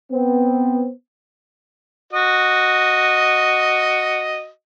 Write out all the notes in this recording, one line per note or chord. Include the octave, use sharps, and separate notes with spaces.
B3 C4
F#4 D#5